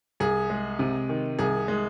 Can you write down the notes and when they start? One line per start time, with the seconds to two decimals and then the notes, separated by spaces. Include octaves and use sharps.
0.20 C2 G#4
0.50 G#3
0.79 C3
1.09 D#3
1.39 C2 G#4
1.68 G#3